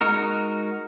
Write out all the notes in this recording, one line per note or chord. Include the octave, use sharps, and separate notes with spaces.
G#3 D#4 F#4 A#4